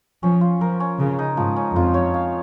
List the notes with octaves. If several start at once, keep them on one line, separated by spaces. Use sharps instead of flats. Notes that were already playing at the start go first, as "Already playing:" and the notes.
F3 C#4
F4
F3 A#4
C#4
C#3 A#4
D#4
G#2 F3
C#4
F2 F4
C#5
F5